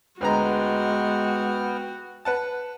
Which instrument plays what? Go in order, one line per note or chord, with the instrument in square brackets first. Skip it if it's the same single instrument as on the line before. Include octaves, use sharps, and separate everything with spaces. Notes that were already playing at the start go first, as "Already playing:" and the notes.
[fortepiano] D2 B4 A#5 [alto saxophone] G#3 [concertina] B3 G5 F6 [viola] F#4
[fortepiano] B4 F#5 A5